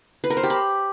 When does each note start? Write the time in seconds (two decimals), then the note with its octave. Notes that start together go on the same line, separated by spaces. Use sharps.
0.24 B4
0.30 A#4
0.37 C5
0.43 G4
0.50 B5